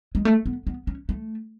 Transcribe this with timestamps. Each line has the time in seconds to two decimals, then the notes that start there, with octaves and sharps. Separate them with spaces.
0.15 G#3
0.25 A3
0.46 B3
0.67 B3
0.87 C#4
1.09 A3